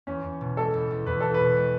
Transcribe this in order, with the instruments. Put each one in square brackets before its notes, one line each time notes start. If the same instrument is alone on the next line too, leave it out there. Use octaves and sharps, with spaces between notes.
[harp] E2 [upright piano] C#4
[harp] E2
B2
[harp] G#3 [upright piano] A4
[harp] E2
E2
[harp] E2 [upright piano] B4
[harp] E2 [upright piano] A4
[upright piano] B4
[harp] B2
G#3